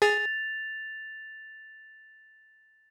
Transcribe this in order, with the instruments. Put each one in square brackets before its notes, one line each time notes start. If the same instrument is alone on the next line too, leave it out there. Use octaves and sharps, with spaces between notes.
[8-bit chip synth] G#4 [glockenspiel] A6 F7